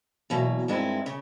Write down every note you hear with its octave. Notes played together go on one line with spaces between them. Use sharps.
E2 B2 F#3 A#3
G2 D#3 G#3 C4 E4
C#3